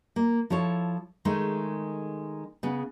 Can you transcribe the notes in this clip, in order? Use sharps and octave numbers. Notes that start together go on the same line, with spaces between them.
A#3
F3 E4 A4 C#5
D#3 G#3 A3
C#3 B3